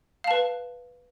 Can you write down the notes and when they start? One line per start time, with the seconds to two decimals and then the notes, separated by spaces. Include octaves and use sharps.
0.24 F5
0.28 A5
0.31 B4